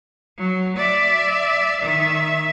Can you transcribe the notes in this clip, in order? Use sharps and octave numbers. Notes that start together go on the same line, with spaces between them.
F#3
D5 E5
D#3 E5